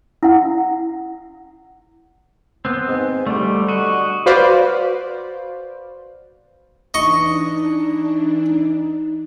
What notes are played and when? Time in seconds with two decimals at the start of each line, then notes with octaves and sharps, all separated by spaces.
0.23 E4 F#5
2.65 B3 C4
2.88 G#2
3.27 D3 G3 A3
3.68 F#4 D#5
4.26 F#4 B4 C5 D5 F5
6.94 E3 D4 D#4 D#5 C#6